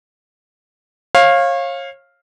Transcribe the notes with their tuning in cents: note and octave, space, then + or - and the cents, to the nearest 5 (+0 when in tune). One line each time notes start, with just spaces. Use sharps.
C#5 -30 F5 +0